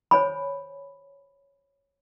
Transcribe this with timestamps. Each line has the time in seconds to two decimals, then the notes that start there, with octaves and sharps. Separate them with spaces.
0.11 C5 C#5 G#5 B5